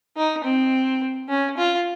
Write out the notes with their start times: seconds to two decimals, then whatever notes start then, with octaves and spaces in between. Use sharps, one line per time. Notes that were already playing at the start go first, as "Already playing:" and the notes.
0.17 D#4
0.45 C4
1.29 C#4
1.58 F4